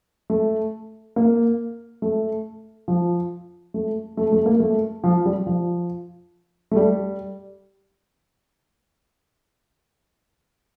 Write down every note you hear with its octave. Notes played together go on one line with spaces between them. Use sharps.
A3
A#3
A3
F3
A3
A3
A3
A#3
A3
F3
G3
F3
A3
G3